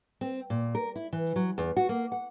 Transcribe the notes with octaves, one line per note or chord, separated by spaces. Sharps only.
C4
A#2
A#4
E4
E3
F#3
E2
F#4
A#3
F#5